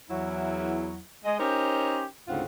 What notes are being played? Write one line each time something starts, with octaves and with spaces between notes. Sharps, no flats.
E2 F#3 E4
G#3 D#5
C#4 D#4 G4 A#4 C5 C#5
D2 G#2 C#3 C4 F4 F#5